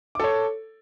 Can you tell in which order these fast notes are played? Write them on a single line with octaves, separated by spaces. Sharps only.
D6 A4 C#5